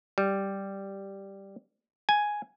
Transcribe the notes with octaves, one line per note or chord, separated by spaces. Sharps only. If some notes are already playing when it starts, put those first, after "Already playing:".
G3
G#5